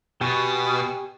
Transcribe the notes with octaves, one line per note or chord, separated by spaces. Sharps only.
B2 G4 G#5 C#6